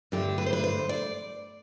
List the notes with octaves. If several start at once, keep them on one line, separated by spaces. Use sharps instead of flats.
G2 D3 A3 G4
B4
C5
B4
C5
D5